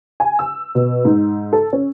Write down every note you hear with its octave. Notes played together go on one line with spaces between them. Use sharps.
G#5
E6
B2
G#2
A4
C#4